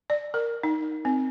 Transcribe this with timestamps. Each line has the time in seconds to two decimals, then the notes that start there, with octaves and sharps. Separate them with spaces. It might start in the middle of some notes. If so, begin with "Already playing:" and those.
0.10 D5
0.34 A#4
0.63 D#4
1.05 C4